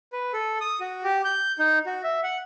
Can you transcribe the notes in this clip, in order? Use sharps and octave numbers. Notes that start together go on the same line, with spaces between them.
B4
A4
D#6
F#4
G4
G6
D#4
F#4
E5
F#5